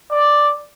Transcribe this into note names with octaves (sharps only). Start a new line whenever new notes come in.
D5